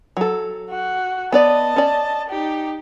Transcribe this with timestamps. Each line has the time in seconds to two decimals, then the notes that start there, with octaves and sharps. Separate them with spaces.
0.17 F#3 A4
0.70 F#4
1.32 B3 B4 D5 D#5 A5
1.76 C#4 D5
2.29 D#4 G4